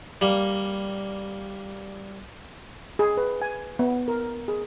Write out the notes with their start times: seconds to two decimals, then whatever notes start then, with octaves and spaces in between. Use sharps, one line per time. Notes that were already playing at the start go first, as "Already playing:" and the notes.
0.21 G3 A#3
2.99 G#4
3.17 B4
3.42 G#5
3.79 B3
4.08 A#4
4.48 G#4